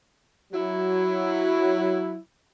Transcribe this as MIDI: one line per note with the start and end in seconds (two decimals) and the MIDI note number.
0.53 2.17 54
0.53 2.17 64